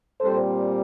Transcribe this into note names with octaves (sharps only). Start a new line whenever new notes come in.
A#2 G3 C4 A4 C5